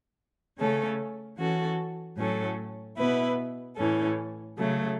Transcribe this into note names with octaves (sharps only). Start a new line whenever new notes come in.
C#3 A3 C#4 A4
E3 C#4 F#4 A4
A2 F#3 C#4 A4
B2 B3 E4 B4
A2 E3 C#4 A4
C#3 F#3 A3